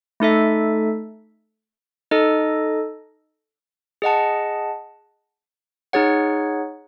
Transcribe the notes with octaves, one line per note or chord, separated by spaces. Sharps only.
A3 D#4 A4 E5
D#4 A4 D#5
G#4 D#5 F#5 A5
D#4 G#4 C#5 F#5